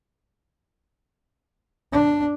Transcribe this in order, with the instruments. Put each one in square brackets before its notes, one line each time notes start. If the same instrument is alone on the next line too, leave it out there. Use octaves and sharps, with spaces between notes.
[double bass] D4